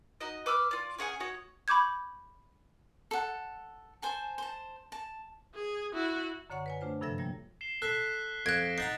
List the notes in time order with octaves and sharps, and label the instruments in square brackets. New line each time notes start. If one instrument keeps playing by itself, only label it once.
[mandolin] D#4 F#4 D#5
B4 D6 E6 F6
F4 D5
C#4 G#4 F#5 G#5
F#4 C#5 F#5 D#6
[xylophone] B5 C#6 D6 G6 G#6
[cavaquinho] A4 F#5
C5 G#5 A5
C5 A5
A5
[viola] G#4
E4 F#4
[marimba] F#2 D3 C#5 F#5 C#6
B4 C#5 G#5
A3 D4 F4 C5
G2 C3 F3 A4 E5 A#6
F3 G3 A#3 A#6
[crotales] C7 E7 G7
[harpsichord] A4 [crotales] F#6 B6 C7
[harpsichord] F2 [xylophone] F#6 G#6 [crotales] A#6 D7
[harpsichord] D#4 F#5 A#5 [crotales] F#6 G6 A6 [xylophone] C7